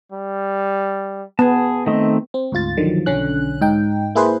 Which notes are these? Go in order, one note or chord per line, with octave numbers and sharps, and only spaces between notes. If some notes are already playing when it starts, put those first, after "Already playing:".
G3
B3 G#4 A5
D#3 A3 C4 D#5
C4
D2 G#2 F4 A6
D3 D#3 F3 F#3
B1 D3 C#4 F#6
G#2 D#4 G5
A#3 E4 G#4 B4 C5